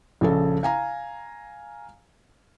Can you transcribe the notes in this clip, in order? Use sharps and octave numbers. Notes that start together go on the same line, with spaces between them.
A#1 C#3 A4
F5 G#5 A#5